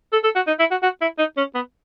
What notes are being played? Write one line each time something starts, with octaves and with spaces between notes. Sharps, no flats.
A4
A4
F#4
D#4
E4
F#4
F#4
E4
D#4
C#4
B3